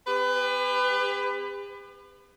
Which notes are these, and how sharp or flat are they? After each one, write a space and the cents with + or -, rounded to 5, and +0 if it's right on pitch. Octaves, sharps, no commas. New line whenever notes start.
C4 -35 G4 +45 B4 +25